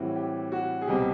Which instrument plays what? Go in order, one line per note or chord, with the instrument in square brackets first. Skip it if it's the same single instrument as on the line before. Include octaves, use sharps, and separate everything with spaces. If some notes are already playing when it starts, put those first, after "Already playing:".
Already playing: [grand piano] A2 E3 G3 C4 F#4
G4
F#4
G#4
C2 B2 G3 C4 G4